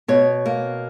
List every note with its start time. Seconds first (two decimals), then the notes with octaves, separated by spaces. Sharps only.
0.08 B2 C#5
0.46 A#3